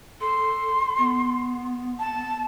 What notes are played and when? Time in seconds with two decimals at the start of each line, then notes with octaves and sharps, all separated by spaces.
0.21 A4 C6
0.98 B3
1.99 A5